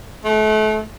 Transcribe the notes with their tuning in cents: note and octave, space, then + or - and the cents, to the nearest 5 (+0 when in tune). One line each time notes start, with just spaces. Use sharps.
A3 -35